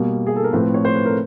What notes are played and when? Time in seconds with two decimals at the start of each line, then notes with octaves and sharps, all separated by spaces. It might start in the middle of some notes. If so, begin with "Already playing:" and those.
Already playing: B2 G3 A#3
0.27 G#4
0.36 A4
0.44 A#4
0.53 A2 F3 A3 C4 B4
0.74 C#5
0.85 C5
0.95 B4
1.06 A#4